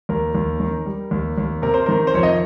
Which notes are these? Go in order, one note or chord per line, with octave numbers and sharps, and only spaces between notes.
D#2 A#4
D#2
D#3
G3
D#2
D#2
C3 A#4
C5
D#3 A#4
C5
F2 C#5
D#5